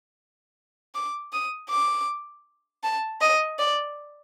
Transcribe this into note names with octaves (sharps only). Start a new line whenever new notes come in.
D6
D#6
D6
A5
D#5
D5